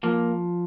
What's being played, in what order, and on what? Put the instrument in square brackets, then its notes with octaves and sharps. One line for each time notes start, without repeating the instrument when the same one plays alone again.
[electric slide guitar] F3 A#3